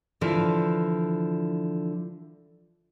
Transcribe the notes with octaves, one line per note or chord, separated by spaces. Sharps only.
D3 E3 F3